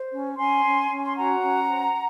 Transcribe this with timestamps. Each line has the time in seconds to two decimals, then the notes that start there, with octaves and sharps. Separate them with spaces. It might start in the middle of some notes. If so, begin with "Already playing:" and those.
Already playing: C5
0.11 C#4
0.37 C#4 G#5 C6
0.64 C#4
0.91 C#4
1.05 C6
1.17 F#4 F#5 A#5
1.43 C#4
1.69 C5